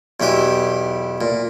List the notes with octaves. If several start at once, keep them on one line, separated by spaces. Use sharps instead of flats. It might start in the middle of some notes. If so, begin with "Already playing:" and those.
B1 E2 E3 G4 G#5
A#2